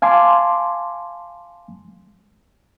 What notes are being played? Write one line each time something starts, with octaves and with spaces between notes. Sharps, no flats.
F5 G#5 A5 C6 D6